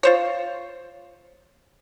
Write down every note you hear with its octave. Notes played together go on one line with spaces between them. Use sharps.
F4 C5 C#5